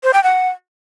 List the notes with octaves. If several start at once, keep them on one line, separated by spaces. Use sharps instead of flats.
C5
G5
F#5